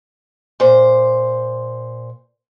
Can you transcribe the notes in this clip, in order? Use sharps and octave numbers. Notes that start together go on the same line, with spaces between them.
A#2 C5